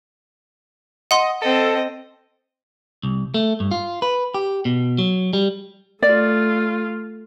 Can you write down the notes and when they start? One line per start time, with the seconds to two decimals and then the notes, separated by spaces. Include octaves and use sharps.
1.11 D#5 F#5 C6
1.42 C4 A4 D#5
3.03 C2
3.34 A3
3.60 G2
3.71 F4
4.02 B4
4.34 G4
4.65 B2
4.98 F#3
5.33 G3
6.03 A3 F4 D5